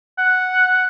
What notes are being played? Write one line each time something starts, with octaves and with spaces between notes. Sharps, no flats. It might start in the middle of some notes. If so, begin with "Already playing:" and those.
F#5